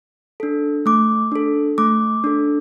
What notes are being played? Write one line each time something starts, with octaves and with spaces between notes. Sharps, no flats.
D4 A4
A3 D6
D4 A4
A3 D6
D4 A4